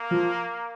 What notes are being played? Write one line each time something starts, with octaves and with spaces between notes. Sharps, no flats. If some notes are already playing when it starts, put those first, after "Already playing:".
Already playing: A#3
F3